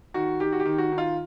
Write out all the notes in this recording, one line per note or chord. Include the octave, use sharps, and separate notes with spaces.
D#3 F#4
D#3 G4
F#4
G4
D#3
F#4
D#3
F4